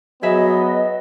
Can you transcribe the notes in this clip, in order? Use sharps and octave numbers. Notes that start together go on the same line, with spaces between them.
F#3 B3 G#4 B4 D#5 E5